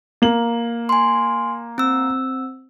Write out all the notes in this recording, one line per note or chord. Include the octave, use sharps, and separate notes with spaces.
A#3 F#7
G#5 C6
C4 E6